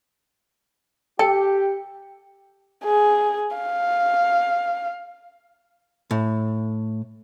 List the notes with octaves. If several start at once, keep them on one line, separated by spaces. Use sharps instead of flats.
G4 A4 G5
G#4
F5
A2